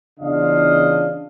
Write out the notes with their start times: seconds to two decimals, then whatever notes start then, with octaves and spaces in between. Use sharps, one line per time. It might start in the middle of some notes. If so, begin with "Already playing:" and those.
0.20 E2 C#3 D4 F4 D#5 F5